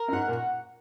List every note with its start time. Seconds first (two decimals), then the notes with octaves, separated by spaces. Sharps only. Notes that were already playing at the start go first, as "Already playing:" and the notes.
Already playing: A#4
0.08 F#2
0.13 G#2 F#5
0.28 A#2
0.33 F#4